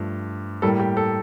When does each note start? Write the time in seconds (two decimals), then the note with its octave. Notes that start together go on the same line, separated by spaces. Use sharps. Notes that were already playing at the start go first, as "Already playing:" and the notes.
Already playing: G2 F3 A3
0.62 A2 G3 A#3 A4
0.80 G4
0.97 A4